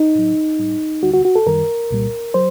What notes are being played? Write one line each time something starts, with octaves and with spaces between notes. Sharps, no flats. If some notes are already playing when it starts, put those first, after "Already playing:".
Already playing: D#4
A2 F#3
A2 G3
D2 D3 G3 F#4
F#4
F#4
A4
F#2 D#3 G3 A#4
C2 A#2 G3
F#3 C5